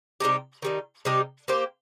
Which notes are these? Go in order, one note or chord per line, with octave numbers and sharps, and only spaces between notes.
C3 G3 D#4 G4
D#3 G3 D#4
C3 G3 D#4 G4
A#3 G4 C5